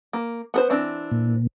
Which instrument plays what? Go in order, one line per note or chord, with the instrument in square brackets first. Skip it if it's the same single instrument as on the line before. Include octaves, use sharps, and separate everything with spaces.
[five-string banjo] A#3
B3 A#4 C5
E3 C4 D4
[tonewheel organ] A#2